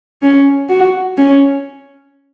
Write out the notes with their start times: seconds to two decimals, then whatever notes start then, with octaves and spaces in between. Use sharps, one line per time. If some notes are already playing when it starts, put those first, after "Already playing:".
0.22 C#4
0.69 F#4
1.17 C#4